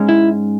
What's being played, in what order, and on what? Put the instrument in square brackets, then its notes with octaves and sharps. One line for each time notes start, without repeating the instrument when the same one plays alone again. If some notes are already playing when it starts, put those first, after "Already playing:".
Already playing: [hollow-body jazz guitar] G#2 G#3 C#4
E4